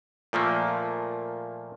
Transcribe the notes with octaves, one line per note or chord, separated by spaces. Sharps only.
A#2 F3 A3 A#3